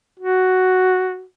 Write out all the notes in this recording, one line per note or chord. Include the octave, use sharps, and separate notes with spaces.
F#4